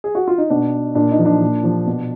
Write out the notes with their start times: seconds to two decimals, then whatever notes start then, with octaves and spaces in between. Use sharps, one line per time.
0.04 G#4
0.15 F#4
0.28 F4
0.38 D#4
0.50 B2 D4
0.95 A#2 D4
1.11 D#4
1.19 F3
1.25 D4
1.41 A#2
1.64 F3
1.87 B2